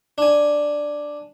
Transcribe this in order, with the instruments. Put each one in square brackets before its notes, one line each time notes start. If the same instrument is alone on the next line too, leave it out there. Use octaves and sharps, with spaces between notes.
[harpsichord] D4 G#5